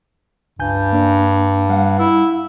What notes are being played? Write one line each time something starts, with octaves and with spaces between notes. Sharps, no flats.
C#2 G2 G#5 G6
A#3 D4
G3 F5 F#5
E4